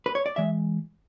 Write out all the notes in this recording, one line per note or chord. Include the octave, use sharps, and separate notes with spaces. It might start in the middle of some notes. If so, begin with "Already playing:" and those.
B4
C#5
D5
E3 G#3 E5